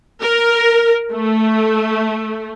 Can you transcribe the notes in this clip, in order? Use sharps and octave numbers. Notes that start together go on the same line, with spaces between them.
A#4
A3